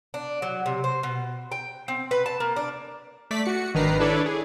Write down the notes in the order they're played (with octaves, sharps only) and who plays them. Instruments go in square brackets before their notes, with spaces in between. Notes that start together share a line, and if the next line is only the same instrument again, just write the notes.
[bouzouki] D4
F#3
C3
C5
B2
G5
C4
B4
A5
A#3
D4
[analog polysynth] A3 D5 B6
F#4 C#7
G#1 D#3 D4 B4 A#5 C7
D4 E4 A4 B4 C#5 D5
G#4